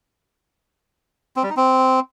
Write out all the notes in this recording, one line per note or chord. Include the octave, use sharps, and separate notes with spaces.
C4
G3
D#4
C4